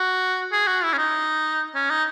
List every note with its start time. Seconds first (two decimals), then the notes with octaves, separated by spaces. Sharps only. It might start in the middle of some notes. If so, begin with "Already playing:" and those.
Already playing: F#4
0.52 G#4
0.67 F#4
0.83 E4
0.93 C#4
0.98 D#4
1.75 C#4
1.90 D#4